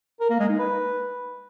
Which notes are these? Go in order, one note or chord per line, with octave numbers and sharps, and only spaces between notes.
A#4
A#3
G#3
D#4
B4